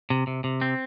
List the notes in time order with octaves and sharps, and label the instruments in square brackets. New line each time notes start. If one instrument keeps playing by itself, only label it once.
[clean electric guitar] C3
C3
C3
C4